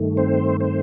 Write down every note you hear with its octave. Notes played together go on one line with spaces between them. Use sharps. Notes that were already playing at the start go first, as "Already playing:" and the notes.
Already playing: G2 D#3 A3
C4 C5
C4 C5